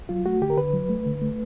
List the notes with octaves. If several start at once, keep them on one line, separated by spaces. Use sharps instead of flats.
F#3 F4
A3 F#4
D3 G4
A#4
D3 B4
F#3
A3
D3
A3